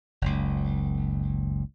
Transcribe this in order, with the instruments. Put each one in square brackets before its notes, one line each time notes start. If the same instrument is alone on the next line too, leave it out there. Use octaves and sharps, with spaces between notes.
[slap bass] F#1 C#2